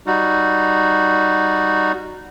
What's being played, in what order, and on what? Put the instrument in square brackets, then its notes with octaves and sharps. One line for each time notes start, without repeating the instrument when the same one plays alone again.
[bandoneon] G3 D#4 F#4